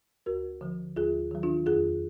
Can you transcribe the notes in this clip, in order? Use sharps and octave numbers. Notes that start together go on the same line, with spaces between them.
D2 F#4 A#4
D3 F3
D#2 F4 G#4
D#3 F#3
D4 F4
F2 F4 G#4